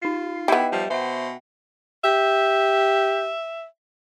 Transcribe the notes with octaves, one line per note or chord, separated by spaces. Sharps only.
D#4 F4 C7
B3 E4 G4 D#5 E5 G5
F3 G3
B2 C5 E5 F#5
G4 E5